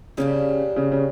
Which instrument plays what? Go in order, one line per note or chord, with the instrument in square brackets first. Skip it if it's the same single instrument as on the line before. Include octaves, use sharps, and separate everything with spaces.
[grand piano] C#3 [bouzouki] G3 A#3 D4 G4
[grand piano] C#3
C#3